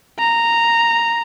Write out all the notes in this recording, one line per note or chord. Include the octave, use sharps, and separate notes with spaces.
A#5